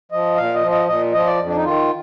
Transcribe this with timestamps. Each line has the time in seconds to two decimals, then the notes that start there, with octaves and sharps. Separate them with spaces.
0.12 F3 D#5
0.37 A#2 F5
0.54 D#5
0.62 F3
0.71 D#5
0.88 A#2 D#5
1.14 F3 D#5
1.27 D5
1.39 F2
1.47 D4
1.55 D#4
1.65 D#3 F4